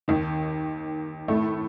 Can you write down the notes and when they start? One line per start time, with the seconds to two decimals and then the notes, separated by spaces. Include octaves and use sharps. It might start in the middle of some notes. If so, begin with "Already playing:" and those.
0.08 D#2 D#3
1.28 A2 A3